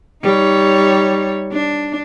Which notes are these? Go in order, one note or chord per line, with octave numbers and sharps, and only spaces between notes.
G3 D#4 C#5
D4